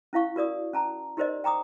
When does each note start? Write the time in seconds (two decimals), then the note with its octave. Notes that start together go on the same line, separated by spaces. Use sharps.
0.13 C#4 E4 F5 C#6
0.36 F#4 A#4 D5 D#6
0.73 C#4 A5 A#5
1.17 D#4 G4 A#4 C5 D5 D#5
1.44 G5 A#5 D6 D#6